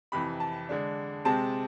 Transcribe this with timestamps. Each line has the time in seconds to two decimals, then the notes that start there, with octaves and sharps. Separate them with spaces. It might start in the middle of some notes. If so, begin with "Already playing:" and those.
0.12 F2 C3 E3 B5
0.40 A5
0.69 D3 G#3 D4
1.25 C3 G#3 C4 A5